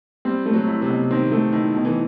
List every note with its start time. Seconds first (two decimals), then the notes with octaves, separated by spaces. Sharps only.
0.25 G3 C4
0.46 A3
0.53 F#3
0.68 E4
0.82 C3
0.89 B2
1.11 D#3 C4
1.32 A3
1.53 D#3 E4
1.74 B2
1.85 E3